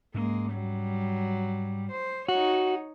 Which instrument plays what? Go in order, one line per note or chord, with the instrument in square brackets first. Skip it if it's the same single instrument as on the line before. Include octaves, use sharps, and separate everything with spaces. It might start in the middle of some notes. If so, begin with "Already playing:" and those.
[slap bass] G#2 C#4 [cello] G#3 A#3
[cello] F#3 G3
C5
[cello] D#4 C#5 [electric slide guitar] F#4